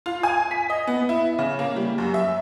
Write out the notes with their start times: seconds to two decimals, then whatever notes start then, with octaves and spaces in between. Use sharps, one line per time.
0.06 F4
0.23 G#5
0.51 B6
0.70 D#5
0.87 B3
1.09 E4
1.39 C#3
1.59 A#3
1.76 G3
1.98 F#2
2.14 E5